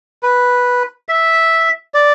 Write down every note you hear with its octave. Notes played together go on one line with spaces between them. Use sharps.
B4
E5
D5